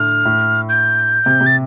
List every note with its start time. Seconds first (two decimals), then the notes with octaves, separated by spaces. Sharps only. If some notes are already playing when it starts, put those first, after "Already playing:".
Already playing: A2 D3 F6
0.25 A2
0.69 G6
1.26 C3
1.41 C3
1.46 A6